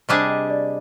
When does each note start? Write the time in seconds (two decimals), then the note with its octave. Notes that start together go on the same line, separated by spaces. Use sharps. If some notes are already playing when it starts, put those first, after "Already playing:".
0.09 C3 G3 D4 G#4 D#5
0.29 D#5
0.50 D5